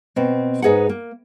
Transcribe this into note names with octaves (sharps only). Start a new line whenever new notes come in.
B2 C4
G#2 D#4 G#4 B4 F#5
A#3